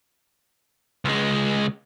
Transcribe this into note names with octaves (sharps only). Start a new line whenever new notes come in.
C#2 G#3